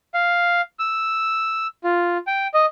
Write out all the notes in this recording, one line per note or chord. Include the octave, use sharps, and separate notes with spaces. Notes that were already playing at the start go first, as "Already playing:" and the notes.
F5
E6
F4
G5
D#5